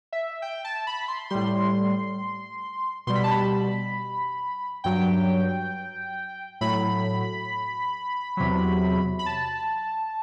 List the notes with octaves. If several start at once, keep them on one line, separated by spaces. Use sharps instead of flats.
E5
G5
A5
B5
C6
A2 G3 C6
B2 G3 C6
B5
A5
B5
G2 F#3 G5
A2 F#3 B5
E2 C3 F#3
B5
A5